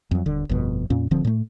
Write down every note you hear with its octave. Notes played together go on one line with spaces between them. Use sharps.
F2 F#3
D#1 D3
G1 F2 B2
F2 A#2 C#4
D1 D3 F3 C4
A2 A3